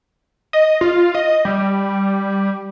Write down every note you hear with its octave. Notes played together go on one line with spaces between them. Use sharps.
D#5
F4
D#5
G3